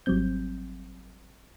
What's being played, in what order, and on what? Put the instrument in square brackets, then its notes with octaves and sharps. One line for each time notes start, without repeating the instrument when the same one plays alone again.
[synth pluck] G#1 F#3 G3 C4 G6